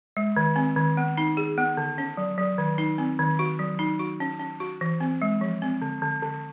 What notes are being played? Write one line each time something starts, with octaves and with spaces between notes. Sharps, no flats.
G#3
D#3
C4
D#3
B3
D#4
G#4
B3
D3
C#4
F#3
F#3
D#3
D#4
C4
D#3
F#4
F#3
D#4
F#4
C#4
C#4
F#4
E3
C4
G#3
F3
C4
D3
D3
D3